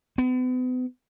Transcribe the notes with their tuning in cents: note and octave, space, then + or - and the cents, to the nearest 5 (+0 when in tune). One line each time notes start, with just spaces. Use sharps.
B3 +40